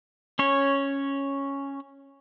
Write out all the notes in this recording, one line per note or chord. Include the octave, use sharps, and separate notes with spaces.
C#4 C#5